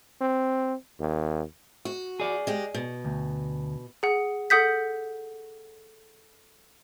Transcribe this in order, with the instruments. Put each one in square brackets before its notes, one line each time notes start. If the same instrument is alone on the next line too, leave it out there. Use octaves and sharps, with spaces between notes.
[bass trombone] C4
D#2
[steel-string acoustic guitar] F#4
[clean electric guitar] G#4 D5
[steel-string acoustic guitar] G#3 G4
B2
[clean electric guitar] D2
[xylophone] G#4 F#5
A4 F#5 D#6 G6 B6